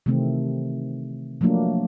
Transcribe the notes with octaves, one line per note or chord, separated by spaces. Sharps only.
C3 D#3 E3 A3 C4
F3 F#3 A3 A#3 D4